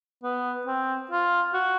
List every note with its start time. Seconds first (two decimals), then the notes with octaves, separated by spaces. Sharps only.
0.23 B3
0.67 C4
1.11 F4
1.54 F#4